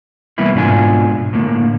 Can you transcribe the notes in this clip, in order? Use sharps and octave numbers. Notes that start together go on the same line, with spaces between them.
C3 E3 G3 A#3 B3 E4
G#2 B2 D4 F4 G#5
A2 D3 A#3